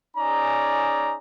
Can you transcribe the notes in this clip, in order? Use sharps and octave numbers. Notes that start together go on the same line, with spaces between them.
C#4 D#4 G#4 D5 A#5